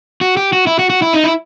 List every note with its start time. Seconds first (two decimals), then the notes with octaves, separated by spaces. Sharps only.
0.21 F#4
0.37 G4
0.53 F#4
0.67 E4
0.79 F#4
0.90 F#4
1.02 E4
1.14 D#4
1.24 E4